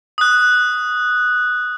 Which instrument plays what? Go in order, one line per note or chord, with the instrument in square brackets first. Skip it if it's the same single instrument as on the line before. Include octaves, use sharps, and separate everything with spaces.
[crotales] D#6 F#6